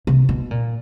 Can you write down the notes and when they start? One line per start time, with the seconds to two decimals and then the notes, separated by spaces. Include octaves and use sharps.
0.07 C3
0.29 B2
0.51 A#2